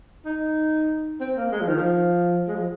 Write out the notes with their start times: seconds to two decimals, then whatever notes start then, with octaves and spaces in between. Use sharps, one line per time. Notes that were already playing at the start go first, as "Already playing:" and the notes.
0.26 D#4
1.20 C4
1.37 A#3
1.52 G#3
1.60 F3
1.68 D#3
1.77 F3
2.48 G#3
2.55 F3